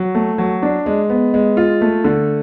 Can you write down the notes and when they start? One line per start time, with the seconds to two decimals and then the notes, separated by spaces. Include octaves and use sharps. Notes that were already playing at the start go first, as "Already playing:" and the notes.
Already playing: F#3
0.15 A3
0.38 F#3
0.63 D4
0.86 G#3
1.10 B3
1.34 G#3
1.57 F4
1.81 A3
2.04 D3